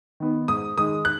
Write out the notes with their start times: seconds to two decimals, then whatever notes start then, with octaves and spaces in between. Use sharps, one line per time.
0.20 D#3 B3
0.48 G#2 D#6
0.77 D#3 G#3 D#6
1.05 F#6